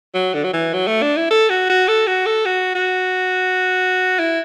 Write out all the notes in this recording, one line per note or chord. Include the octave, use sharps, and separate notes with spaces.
F#3
D3
F#3
E3
F#3
A3
D4
E4
A4
F#4
F#4
A4
F#4
A4
F#4
F#4
E4